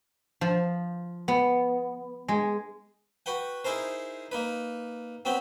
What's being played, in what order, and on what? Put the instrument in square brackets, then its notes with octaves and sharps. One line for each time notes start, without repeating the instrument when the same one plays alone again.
[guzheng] F3
B3
G#3
[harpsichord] F#4 B4 F#5 G5
D#4 E4 G#4 A#4 C5
A#3 D#4 B4
F#3 B3 C4 G5 B5